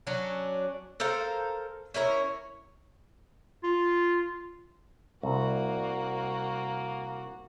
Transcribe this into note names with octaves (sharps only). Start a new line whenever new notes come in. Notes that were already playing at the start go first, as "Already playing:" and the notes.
F#3 C#4 D4
A4 A#4 C5 F5
C#4 E4 A#4 C#5
F4
C2 A#3 F#4